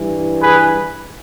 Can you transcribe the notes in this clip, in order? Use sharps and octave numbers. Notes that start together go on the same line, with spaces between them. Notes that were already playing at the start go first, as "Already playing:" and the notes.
Already playing: G2 E3
G#4 B4